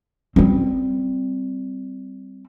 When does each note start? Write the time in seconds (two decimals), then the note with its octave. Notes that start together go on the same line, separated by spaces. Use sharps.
0.36 G3 C4